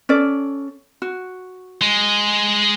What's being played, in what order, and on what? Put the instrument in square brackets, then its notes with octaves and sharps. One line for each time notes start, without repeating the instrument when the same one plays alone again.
[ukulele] C#4 A4 D5
F#4
[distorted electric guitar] G#3